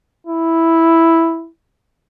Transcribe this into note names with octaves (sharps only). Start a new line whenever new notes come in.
E4